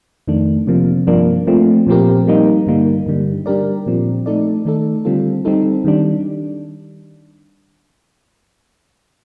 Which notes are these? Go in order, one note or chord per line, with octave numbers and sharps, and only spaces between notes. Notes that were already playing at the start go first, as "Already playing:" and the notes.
F2 D#3 A3 D4
C3 F3 A#3
G2 F3 A#3 D4
F3 A3 C4
A#2 F3 C4 G4 A#4
G3 A#3 D#4
G2 D3 G3 A#3 D#4
G2 D3 G3
G3 D4 G4 A#4 D5
A#2 F3 C4
A3 D#4 A4 D5
D#3 A3 D#4 A4
D3 G3 C4 F4 A4
G3 C4 D#4 A4
D#3 G3 D4